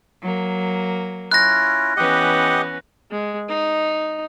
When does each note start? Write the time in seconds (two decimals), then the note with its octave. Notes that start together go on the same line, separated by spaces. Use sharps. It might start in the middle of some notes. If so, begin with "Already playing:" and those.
0.21 F#3 A#3
1.31 C#4 E4 F4 F#6 A#6
1.97 E3 B3 C#4 G4 D#5 F#5
3.11 G#3
3.49 D#4